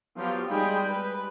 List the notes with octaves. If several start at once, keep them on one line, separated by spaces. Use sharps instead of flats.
F3 F#3 B3 F4 G4
G3 G#3 D#4 G#4 G5 B5
B4